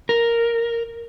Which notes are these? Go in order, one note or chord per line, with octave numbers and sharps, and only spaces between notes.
A#4